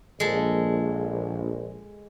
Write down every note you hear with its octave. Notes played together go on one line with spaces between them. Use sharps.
A#1 G#3 A4